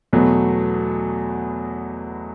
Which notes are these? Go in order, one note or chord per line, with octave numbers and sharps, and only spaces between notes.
E2 B2 F#3 A3